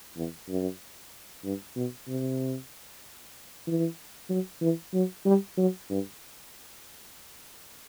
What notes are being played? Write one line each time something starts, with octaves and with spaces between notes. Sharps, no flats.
E2
F#2
G2
B2
C3
E3
F#3
E3
F#3
G3
F#3
G2